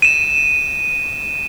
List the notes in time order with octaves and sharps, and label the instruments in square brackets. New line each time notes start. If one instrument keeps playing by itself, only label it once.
[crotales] D#7 E7